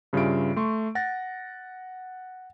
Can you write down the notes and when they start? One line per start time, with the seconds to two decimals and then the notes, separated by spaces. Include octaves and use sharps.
0.13 G2 C#3 G3 F4 E5 D7
0.56 A3 C6 C#6
0.95 F#5 A6 A#6